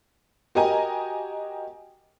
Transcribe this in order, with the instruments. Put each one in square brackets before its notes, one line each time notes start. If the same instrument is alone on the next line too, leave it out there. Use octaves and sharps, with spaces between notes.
[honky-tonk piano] F#4 G4 A#4 D#5 G#5 A#5